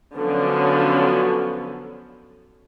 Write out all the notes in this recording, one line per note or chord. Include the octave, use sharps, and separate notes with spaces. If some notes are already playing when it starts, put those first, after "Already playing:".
D3 F3 F#3 B3 C#4 A4